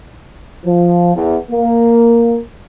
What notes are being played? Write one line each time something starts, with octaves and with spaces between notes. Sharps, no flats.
F3
E2
A#3